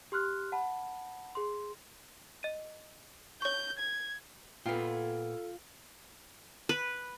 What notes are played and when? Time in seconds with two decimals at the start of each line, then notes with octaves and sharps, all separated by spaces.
0.12 G4 C6 F6 F#6
0.52 F#5 A5 B5
1.35 G#4 C6
2.43 D#5 D#7
3.42 C#5 C#6 G6
3.79 G#6
4.66 A#2 B3 F4 A4 G5
6.69 B4